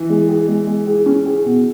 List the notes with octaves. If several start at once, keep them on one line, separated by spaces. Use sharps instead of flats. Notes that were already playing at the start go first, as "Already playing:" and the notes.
Already playing: E3
G#3
G#4
G#3
G#3
G#4
C#4
G#4
B2